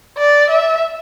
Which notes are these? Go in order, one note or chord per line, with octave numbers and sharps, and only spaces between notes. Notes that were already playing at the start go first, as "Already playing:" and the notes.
D5
E5